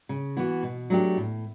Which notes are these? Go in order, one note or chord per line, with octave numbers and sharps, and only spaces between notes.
C#3
E3 B3 F#4
B2
F#3 A3 D4 G4
A2